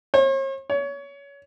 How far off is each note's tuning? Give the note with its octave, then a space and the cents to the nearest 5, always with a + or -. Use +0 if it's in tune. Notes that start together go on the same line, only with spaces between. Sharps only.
C#5 -45
C#5 +25